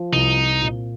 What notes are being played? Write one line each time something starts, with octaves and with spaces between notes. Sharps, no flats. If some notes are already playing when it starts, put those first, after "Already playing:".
Already playing: F3
C2 D#4
C4
A#2